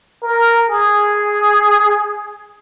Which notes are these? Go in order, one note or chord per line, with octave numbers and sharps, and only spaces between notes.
A#4
G#4